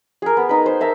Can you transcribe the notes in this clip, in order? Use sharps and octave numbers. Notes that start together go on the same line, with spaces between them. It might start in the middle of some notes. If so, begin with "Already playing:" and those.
G#4 A#4
B3
D#4 B4
C5
A#4 E5 A5